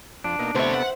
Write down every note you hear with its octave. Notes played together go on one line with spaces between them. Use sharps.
F2 D4
B2 A#3 D#4
D2 C3 B3 A4 C5 C#5 E5
F#5